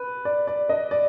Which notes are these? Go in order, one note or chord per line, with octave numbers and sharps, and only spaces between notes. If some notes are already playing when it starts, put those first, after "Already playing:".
Already playing: B4
D5
D5
D#5
D5